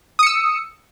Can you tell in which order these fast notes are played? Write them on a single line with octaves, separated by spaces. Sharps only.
D#6 C#7 E6